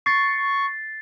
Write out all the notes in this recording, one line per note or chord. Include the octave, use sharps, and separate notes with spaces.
C#6 A6 C7